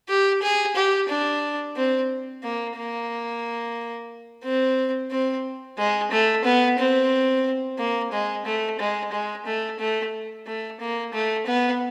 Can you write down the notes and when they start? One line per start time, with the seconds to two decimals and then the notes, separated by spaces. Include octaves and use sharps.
0.09 G4
0.42 G#4
0.76 G4
1.09 D4
1.76 C4
2.43 A#3
2.76 A#3
4.43 C4
5.10 C4
5.78 G#3
6.11 A3
6.44 B3
6.78 C4
7.78 A#3
8.12 G#3
8.45 A3
8.79 G#3
9.12 G#3
9.46 A3
9.79 A3
10.46 A3
10.80 A#3
11.13 A3
11.46 B3